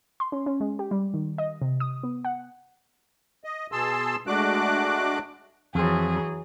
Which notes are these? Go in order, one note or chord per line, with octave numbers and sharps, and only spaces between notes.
C6
C#4
C#4
G#3
G4
G3
D#3
D#5
C3
D#6
B3
F#5
D#5
B2 G#4 A5 C6 E6
G#3 A3 D4 F#4 D6 F#6
F2 E3 F#3 G#4 C5